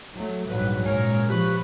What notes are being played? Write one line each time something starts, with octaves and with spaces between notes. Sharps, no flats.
F#3 A3
A#1 G#2 F#3 G3 B4
A#2 C#3 G#3 A#4 C#5
F3 G4 B4 B5 C#6